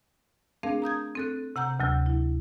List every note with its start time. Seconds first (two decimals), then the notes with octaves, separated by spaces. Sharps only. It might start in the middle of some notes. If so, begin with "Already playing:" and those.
0.63 A3 C4 D4 G#4 A#4 F5
0.82 A#5 D#6 G6 G#6
1.15 C4 A4 F#6
1.56 C3 F#5 A#5 G6
1.80 D2 C3 F#3 E6 G6
2.06 E4